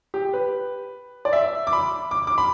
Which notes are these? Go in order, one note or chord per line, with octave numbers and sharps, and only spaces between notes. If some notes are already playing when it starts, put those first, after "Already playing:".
G4
B4
D5
E5
D6
B5
D6
D6
B5